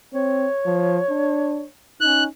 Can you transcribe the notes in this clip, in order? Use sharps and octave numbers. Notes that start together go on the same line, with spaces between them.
C4 C#5
F3
D4
C#4 D#4 F#6